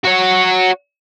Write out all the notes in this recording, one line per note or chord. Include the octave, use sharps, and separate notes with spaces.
F#4 C#5